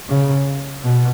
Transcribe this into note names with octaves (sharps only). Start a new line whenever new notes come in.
C#3
B2